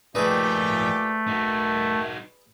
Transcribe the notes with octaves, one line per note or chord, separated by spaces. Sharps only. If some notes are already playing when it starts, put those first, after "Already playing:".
A#2 F3 A3 D#4 G4 G#4 B4 D5
D#4 F#4 A#4 G5 A5